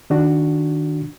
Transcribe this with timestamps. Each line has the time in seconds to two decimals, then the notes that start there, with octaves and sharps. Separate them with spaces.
0.10 D#3 D4 F#4